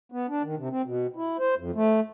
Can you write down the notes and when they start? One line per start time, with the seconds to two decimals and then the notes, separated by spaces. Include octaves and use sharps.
0.12 B3
0.29 D4
0.43 D#3
0.57 C3
0.70 C4
0.86 B2
1.16 E4
1.39 C5
1.58 F2
1.75 A3